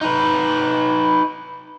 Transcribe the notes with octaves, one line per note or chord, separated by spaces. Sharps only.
D#4 B4